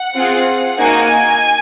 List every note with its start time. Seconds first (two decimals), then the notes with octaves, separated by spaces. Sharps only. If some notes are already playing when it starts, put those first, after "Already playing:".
Already playing: F#5
0.15 C4 F4 G#4
0.80 A#3 D#4 F#4 G#5